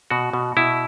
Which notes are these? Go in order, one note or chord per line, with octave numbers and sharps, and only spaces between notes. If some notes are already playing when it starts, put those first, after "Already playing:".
B2 F#4
B2
B2 E4